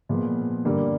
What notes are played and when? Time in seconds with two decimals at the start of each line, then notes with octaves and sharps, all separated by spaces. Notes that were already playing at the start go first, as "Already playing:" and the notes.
0.09 A#2 F3 G#3 B3
0.65 G2 D3 G3 A#3